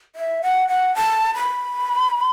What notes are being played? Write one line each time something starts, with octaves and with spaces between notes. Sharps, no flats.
E5
F#5
F#5
A5
B5